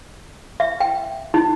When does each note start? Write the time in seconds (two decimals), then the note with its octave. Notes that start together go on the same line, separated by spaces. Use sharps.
0.60 E5
0.80 G5
1.34 D#4